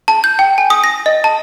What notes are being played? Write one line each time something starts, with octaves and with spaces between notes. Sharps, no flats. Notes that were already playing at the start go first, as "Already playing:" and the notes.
A5
G6
G5
G#5
D#6
A#6
D#5
A5